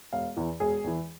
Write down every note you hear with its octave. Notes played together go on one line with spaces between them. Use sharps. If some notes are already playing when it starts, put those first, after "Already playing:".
E1 F5
E2 E3
E1 G#4
E2 E3